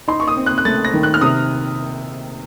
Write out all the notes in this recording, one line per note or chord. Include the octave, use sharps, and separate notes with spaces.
D#4 C6
C#6
D#6
C4
F#6
F#6
A3 A6
A#6
D#3
F#6
F6
C3 D#6